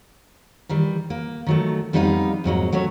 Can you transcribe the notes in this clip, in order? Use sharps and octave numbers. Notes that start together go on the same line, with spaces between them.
D#3 E3 G3
A#3
D#3 F#3 A3
F2 G3 B3 D#4 B4 F5
F2 G#2 F#3 A#3
F#3 A3 C#4 C#5